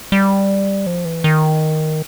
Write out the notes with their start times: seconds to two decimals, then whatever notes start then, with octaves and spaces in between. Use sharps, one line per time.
0.12 G3
0.86 F3
1.05 E3
1.24 D#3